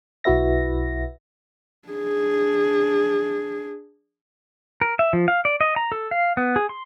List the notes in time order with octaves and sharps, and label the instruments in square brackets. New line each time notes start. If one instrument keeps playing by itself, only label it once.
[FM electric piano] B1 E4 F#4 B4 E5 A#6
[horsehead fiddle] D4 G#4
[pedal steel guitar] A#4
E5
F3
F5
D5
D#5
A#5
A4
F5
B3
G#4
C6